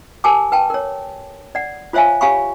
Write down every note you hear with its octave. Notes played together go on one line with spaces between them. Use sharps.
G4 A#4 G#5 A5 D6
B4 G5 A5
A#4 C#5
D5 F#5
F4 C5 C#5 E5 F5 G#5
G4 C#5 F5 G#5 B5 C#6